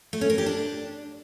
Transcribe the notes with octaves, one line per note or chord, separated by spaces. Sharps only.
A3
C#4
A#4
G4
D4